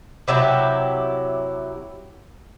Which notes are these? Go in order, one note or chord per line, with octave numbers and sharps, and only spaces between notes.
C3 F#3 E4 G4